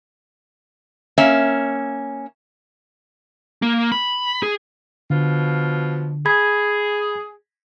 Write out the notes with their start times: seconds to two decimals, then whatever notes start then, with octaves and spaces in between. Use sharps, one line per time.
1.18 A#3 C#4 E5
3.62 A#3
3.92 B5
4.43 G#4
5.10 B2 D3 F3 F4
6.26 G#4 B5 G#6